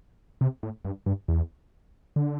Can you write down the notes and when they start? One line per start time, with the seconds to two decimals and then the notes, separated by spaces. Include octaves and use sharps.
0.41 C3
0.63 A2
0.85 G2
1.06 G2
1.28 E2
2.16 D3